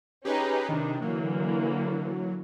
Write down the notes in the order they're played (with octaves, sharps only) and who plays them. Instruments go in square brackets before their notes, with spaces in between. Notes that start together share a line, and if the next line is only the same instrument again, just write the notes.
[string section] C#4 D#4 [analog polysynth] G4 G#4 B4
[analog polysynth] C3 D#3 [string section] D4 D#4
[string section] D3 E3 A#3 [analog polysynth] F#3